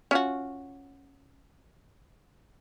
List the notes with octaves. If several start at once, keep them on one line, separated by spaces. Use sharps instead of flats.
C#4 F4 F#4